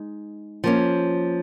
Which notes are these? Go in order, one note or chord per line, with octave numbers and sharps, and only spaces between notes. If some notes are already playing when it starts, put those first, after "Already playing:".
Already playing: G#3 D#4
F3 A#3 C#4